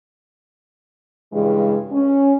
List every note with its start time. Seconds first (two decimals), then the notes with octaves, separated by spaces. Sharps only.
1.33 G2 C#3 E3 G#3
1.92 C#4